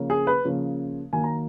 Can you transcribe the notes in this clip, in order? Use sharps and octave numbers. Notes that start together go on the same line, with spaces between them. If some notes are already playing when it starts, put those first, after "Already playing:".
Already playing: C#3 F3 A#3 C#4
G#4
B4
C#3 F3 A#3 C#4
D#3 F#3 A#3 G#5
A#5